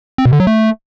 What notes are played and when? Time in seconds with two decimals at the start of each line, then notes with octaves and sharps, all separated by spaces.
0.18 C4
0.25 B2
0.33 D3
0.40 F#3
0.47 A3